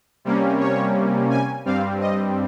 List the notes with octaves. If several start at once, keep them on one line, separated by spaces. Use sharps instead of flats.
C3 G3 A#3 C#4
C#5
G#5
G2 G3 C4 F5
D#5